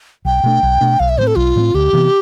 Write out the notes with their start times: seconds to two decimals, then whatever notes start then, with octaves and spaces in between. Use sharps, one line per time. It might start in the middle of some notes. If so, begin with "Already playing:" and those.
0.25 B1 G5
0.43 B2 A3 D4
0.63 B1
0.81 B2 A3 D4
1.00 B1 F5
1.09 E5
1.18 A2 F3 C5
1.23 C4 A4
1.36 B1 F4
1.56 A2 F3 C4
1.74 D2 G4
1.93 C3 E3 B3